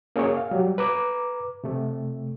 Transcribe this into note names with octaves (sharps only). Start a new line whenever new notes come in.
A#3 C#4 G#4 C#5
F5
F#3 G3
B4 A#5 D6
C3 A3